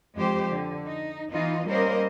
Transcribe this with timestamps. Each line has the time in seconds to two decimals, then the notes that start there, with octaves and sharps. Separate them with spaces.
0.16 F2 G#3 G4 C5
0.51 D3
0.86 D#4
1.32 E3 B3 D#4 F4 D#5
1.68 G3 A#3 C#4 A#4 C5 D#5